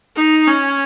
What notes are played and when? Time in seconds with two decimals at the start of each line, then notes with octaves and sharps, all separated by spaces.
0.16 D#4
0.47 C#4